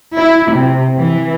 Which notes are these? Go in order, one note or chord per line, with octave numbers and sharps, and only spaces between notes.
E4
C3
E3